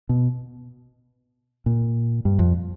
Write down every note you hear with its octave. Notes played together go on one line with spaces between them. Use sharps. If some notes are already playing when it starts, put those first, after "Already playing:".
B2
A#2
G2
F2